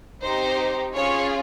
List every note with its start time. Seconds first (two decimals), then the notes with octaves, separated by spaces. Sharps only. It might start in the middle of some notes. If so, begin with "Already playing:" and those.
0.23 C4 D#4 G4 C5
0.95 C#4 F4 G#4 C#5